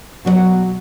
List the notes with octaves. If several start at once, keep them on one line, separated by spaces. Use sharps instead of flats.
B2 F#3 C#5 F#5